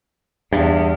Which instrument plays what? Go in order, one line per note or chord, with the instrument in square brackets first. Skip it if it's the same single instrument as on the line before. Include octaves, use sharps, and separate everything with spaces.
[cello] E2 [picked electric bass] G2